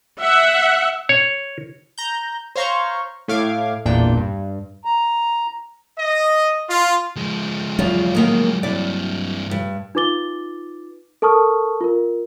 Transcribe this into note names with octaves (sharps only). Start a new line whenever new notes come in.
E5 F#5
C#5
A#5 G6
C5 C#5 F5 A#5 C6 C#6
A2 A3 F5 D6 G#6
A1 E2 A#2 D4 G5
G2
A#5
D#5
F4
F3 G#3
E2 F#3 F4
D#3 A#3 B3
G2 C3 E4 D5
G2
D#4 F4 B4 D6 A6 G7
A4 A#4 A5 C#6 D#6 F6
F4 A#4